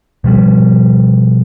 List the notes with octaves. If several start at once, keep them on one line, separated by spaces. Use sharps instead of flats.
B2 F3 G3